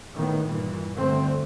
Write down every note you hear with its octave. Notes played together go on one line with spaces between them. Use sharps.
A2 D#3 B3
G2 A#2 E3
D2 G2 D3 A3 C4